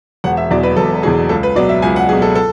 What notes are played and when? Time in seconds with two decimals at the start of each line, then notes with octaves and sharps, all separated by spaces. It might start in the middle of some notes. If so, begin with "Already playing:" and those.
0.24 E1 F#5
0.37 E5
0.50 E2 B2 F#3 D5
0.63 B4
0.76 E1 A4
1.03 E2 B2 F#3 G#4
1.29 C#2 A4
1.43 B4
1.56 B2 F#3 D5
1.69 E5
1.82 C#2 G#5
1.96 F#5
2.09 F#3 G#4
2.13 B2
2.22 A4
2.35 A4